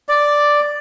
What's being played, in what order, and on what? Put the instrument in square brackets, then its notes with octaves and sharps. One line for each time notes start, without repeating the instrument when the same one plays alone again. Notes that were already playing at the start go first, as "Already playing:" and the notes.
[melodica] D5